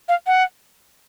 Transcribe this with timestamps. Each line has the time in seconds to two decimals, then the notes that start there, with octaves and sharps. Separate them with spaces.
0.09 F5
0.27 F#5